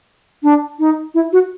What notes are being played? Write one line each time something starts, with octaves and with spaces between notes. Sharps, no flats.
D4
D#4
E4
F#4